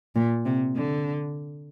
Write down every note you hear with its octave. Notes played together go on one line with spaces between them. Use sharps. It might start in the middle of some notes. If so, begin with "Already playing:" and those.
A#2
C3
D3